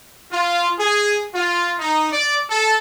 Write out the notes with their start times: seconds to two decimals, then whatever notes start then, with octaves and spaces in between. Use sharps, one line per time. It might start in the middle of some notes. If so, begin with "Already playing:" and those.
0.32 F4
0.79 G#4
1.34 F4
1.79 D#4
2.12 D5
2.50 A4